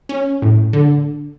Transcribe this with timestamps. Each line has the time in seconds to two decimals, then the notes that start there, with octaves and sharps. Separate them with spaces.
0.09 C#4
0.42 A2
0.73 D3